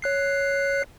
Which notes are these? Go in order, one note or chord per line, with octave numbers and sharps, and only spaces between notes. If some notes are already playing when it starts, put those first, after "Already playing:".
C#5 F#6 C7